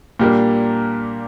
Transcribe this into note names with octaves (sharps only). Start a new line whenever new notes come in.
A#2 G3 A#3 D4